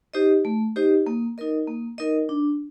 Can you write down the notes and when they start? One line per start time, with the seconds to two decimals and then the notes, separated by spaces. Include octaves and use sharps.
0.14 D#4 G4 C5 D#5
0.45 A3
0.76 D#4 G4 C5 D#5
1.07 A#3
1.38 D#4 A#4 D#5
1.67 A#3
1.98 D#4 A#4 D#5
2.29 D4